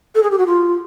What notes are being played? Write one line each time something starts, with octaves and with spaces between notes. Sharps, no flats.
A4
G#4
G4
F#4
F4